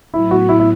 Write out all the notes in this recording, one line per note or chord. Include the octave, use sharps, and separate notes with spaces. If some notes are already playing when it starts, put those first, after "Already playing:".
A2 F#3 B3 E4
F#4
E4
E4